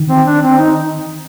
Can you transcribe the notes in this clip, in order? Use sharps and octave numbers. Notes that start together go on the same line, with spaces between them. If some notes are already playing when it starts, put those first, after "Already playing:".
Already playing: D#3
C4
D4
C4
D#4